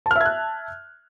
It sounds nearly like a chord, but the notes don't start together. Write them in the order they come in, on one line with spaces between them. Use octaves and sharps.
A5 F6 E5 G#6 F#6